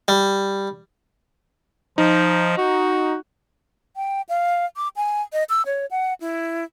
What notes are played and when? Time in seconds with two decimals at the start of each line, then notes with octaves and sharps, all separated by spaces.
0.08 G3
1.98 F3 D#4
2.58 F#4
3.96 G5
4.29 F5
4.76 D6
4.96 G#5
5.33 D#5
5.49 E6
5.66 C#5
5.91 F#5
6.20 E4